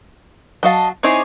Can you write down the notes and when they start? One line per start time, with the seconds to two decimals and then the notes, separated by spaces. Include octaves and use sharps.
0.63 F#3 F#4 D#5 F5 A5
1.03 C4 D#4 E4 G#4 C#5 D6